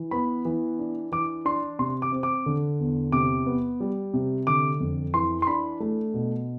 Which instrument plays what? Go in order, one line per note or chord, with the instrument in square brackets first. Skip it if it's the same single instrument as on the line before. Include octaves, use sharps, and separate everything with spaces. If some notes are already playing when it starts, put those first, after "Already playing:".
Already playing: [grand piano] E3
B3 B5
E3
D4
E3 D6
D4 C6
C3 C6
D6
C4
D6
D3
E2
C3 D6
B3
G3
C3
D3 D6
F2
E3 C6
C6
D4 B5
A3
B2